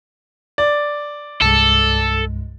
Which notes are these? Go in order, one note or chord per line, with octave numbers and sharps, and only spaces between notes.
D5
C2 G2 G#3 A4